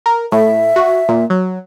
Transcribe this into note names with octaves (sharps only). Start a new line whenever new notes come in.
A#4
A2 E5
F#4
A#2
F#3